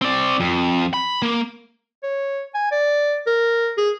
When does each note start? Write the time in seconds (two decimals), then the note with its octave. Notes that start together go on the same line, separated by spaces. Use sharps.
0.02 C4 D5
0.40 F2
0.94 B5
1.22 A#3
2.03 C#5
2.54 G#5
2.72 D5
3.27 A#4
3.78 G#4